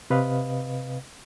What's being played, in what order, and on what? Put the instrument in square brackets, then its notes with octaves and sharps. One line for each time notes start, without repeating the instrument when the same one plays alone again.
[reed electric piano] C3 B4 D#5 F5